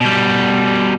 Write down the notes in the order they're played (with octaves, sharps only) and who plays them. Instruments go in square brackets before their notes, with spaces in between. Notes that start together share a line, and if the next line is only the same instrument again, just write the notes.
[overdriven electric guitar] B2 G3